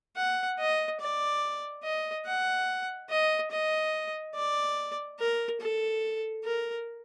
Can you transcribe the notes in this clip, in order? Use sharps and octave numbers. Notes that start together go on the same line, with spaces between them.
F#5
D#5
D5
D#5
F#5
D#5
D#5
D5
A#4
A4
A#4